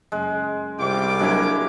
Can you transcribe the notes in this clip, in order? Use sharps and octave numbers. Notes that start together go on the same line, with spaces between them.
F#1 G#3
C2 F4 G5 D6
F#3 G#3 A#3 D4 E4